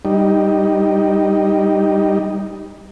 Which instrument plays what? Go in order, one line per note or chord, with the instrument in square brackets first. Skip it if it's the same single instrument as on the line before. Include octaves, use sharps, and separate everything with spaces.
[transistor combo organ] G3 D#4